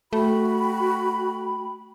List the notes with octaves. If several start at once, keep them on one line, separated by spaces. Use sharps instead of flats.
A3 F#4 G5 B5